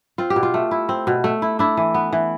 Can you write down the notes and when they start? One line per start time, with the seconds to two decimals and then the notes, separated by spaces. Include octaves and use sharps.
0.18 C4 F4
0.30 G4
0.36 B2
0.43 F4
0.54 A3
0.71 E4
0.89 C4
1.07 B2
1.24 A3
1.42 E4
1.59 D4 E4
1.77 E3
1.94 B3
2.12 E3